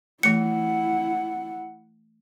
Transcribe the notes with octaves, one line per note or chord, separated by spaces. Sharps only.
E3 A3 E4 F#5 C#7